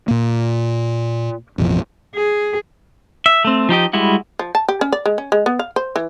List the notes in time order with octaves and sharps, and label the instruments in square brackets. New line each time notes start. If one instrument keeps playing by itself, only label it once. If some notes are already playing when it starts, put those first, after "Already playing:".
[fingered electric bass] A#2 A#3
A1 F2 B2 F3
[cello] G#4
[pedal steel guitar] E5
A3 C4
F3 D#4 G4 D#5
G3 G#3 E4 F#4
[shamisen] F3
A5
G4
C#4
D5
G#3
C#4
G#3
B3
F5
C5
E3